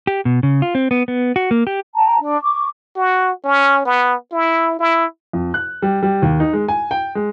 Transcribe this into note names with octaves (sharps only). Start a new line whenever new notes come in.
G4
B2
C#3
F4
C4
B3
B3
F#4
A#3
G4
G5 A5 A#5
D4
C#6 D6
F#4
C#4
B3
E4
E4
F2
F#6
G3
G3
D#2
D#4
G#3
G#5
G5
G#3